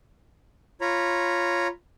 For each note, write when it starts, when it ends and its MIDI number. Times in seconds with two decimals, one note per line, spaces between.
0.81 1.67 65
0.81 1.67 73
0.81 1.67 82
0.81 1.67 83